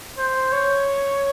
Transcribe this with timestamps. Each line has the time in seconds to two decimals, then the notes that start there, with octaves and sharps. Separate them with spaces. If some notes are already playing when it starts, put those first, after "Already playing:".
0.18 C5
0.52 C#5